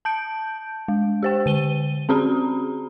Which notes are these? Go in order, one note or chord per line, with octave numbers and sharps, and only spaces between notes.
A5 G6 D7
G#3
G4 C5 G5
D3 D#7 G7
C4 C#4 F#4 G#4 A#5 B5